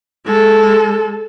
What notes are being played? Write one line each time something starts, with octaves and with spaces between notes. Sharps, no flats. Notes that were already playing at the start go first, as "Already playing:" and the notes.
G#3 A4